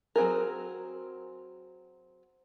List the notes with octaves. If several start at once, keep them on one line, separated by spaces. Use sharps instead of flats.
F#3 C4 G#4 A#4